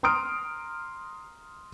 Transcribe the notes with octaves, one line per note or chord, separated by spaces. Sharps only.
A#5 C6 D#6 F6 D7